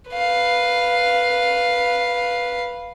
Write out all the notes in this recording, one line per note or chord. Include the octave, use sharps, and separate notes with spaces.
B4 F5